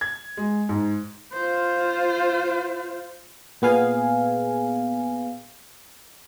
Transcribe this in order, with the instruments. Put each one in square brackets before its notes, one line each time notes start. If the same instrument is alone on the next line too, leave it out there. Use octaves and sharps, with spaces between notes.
[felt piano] G#6
G#3
G#2
[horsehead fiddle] F4 C5
[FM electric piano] A#2 B3 G#4 F5 G#5